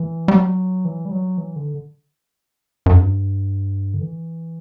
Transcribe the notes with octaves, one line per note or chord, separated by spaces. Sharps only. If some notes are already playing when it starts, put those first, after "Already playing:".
Already playing: E3
G3
F#3
E3
G3
F#3
E3
D3
F#2
G2
D3
E3